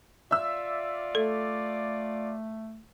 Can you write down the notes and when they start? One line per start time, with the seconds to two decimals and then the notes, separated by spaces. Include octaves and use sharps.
0.31 F4 D5 E5 E6
1.15 A3 A4